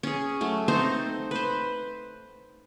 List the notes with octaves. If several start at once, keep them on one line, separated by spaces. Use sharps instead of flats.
C#4 G#4
F#3 A3
C4 D#4 A4 C5
B4 C5